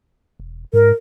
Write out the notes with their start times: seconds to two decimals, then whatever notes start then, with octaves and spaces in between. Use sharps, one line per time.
0.39 E1
0.73 G#2 A#4